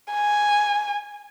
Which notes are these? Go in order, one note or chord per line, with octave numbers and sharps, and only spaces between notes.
G#5